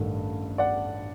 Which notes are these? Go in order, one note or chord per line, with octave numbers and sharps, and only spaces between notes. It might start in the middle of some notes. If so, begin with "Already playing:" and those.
Already playing: A1 G2 D#3 A3
D5 F#5